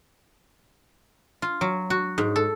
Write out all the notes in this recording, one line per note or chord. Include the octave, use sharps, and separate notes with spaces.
F4
F#3
F#4
G#2
A4